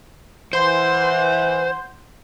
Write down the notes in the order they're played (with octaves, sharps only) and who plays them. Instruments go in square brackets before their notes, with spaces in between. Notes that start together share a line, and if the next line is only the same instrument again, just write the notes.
[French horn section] E3 [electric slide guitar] C5 [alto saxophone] F#5 [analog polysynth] C6 G6